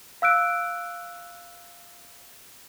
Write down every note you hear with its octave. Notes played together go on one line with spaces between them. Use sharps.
F5 E6 F#6 D7